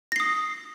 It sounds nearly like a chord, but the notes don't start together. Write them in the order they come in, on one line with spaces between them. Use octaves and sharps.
A#6 C7 D#6